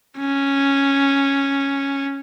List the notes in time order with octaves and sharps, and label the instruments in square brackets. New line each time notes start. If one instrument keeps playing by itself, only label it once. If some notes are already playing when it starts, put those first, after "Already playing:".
[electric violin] C#4